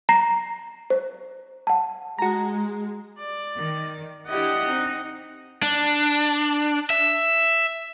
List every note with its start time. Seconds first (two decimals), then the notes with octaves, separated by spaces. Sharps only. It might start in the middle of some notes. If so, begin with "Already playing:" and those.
0.09 A#5 A#6 C7
0.90 C5
1.67 F#5 A5
2.19 G#3 F#4 A#5
3.19 D5
3.57 D#3
4.28 D4 E4 G4 D#5 F#5
4.67 C4 D#4
5.62 D4
6.90 E5